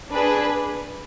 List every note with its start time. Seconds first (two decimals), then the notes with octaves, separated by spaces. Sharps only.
0.11 D4 G#4 B4